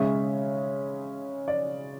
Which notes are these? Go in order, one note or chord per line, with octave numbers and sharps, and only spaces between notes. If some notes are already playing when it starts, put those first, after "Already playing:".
Already playing: C#3 G#3 C#4 E5
D5